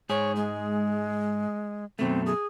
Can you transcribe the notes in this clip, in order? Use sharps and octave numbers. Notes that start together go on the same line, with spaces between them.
G#2 G#4 C#5
G#3
F#2 B2 A3 C4
G#4